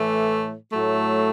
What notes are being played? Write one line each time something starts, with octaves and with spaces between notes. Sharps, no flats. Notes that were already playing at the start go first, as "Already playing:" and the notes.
Already playing: A2 E3 A3
A2 F#3 A3